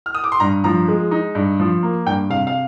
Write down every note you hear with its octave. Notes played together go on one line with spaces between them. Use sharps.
F6
D#6
D6
C6
G2 A#5
F3 A#5
G#3
D#4
G2
F3
A#3
G2 G5
C3 F5
F5